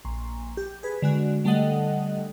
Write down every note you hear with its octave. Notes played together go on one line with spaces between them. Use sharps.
A#1
G4
G#4 B4
D3 G#3 F#4
D3 G3 A3 A4 D#5 F#5